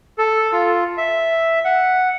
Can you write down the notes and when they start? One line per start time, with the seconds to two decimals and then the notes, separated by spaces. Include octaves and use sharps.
0.18 A4
0.52 F4
0.97 E5
1.65 F#5